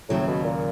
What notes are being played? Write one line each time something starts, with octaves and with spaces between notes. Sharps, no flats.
D#2 A2 C#3 F#3
B2
A#2